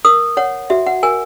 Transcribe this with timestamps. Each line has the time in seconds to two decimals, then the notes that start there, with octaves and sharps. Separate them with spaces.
0.05 A#4 D#6
0.37 C#5 F#5
0.70 F#4 E5
0.87 F#5
1.03 A#4 G#5